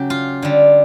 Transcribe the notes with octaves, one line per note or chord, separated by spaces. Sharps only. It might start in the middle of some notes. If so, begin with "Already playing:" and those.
Already playing: C#3 F#3 G4
F4
D3 G3